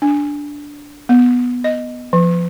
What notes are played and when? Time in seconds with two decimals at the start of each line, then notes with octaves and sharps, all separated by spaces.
0.02 D4
1.09 B3
1.64 D#5
2.13 F3